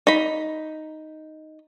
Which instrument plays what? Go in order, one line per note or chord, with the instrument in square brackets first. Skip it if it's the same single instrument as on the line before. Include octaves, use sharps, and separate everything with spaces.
[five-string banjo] D#4 B5